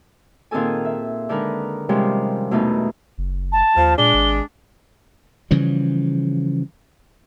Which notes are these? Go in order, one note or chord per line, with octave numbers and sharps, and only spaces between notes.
A#2 D#3 C4 G#4 A4 G#5
E5
D3 D#3 G#3 D#4 A#4 B4
C3 D#3 F3 G3 G#3 C#4
E2 B2 D#3 A3 D#4
F#1
A5
D#2 F3
A#2 G#3 D4 G7
G#1
C#3 E3 F3 G3